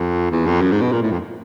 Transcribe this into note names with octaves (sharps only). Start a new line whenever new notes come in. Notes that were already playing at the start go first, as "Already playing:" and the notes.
Already playing: F2
E2
F2
F#2
G#2
B2
A#2
A2
F2